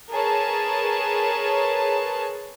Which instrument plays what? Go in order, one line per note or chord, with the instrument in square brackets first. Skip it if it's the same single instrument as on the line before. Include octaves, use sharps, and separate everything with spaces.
[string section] G#4 A#4 B4 C#5 A5